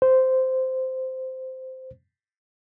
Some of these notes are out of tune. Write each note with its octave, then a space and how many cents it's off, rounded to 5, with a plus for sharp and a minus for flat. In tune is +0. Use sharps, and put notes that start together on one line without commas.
C5 -10